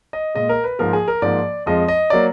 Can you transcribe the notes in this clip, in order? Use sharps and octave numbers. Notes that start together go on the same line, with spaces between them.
D#5
A#2 G#3 D#5
A#4
B4
G#2 F3 A#3 A#4
G#4
A#4
G#2 F3 A#3 D5
F2 F3 G#3 D#5
D#5
F#3 A#3 D5